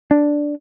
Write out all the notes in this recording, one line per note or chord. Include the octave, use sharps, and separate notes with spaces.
D4